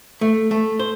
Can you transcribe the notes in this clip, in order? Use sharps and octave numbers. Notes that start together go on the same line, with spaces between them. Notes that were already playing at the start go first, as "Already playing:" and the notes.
A3
A3
C5